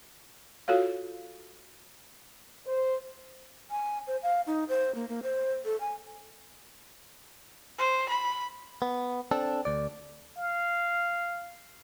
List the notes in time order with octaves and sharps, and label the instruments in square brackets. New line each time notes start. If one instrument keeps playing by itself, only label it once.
[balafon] F4 F#4 A4 C#5 F5
[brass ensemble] C5
[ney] G#5
C5
F5
D#4
C5
A#3
A#3
C5
A4
G#5
[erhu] C5
B5
[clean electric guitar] B3
C4 D4 A4
D2 D5
[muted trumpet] F5